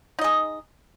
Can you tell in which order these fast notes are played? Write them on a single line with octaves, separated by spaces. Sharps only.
D#4 D#5 G#4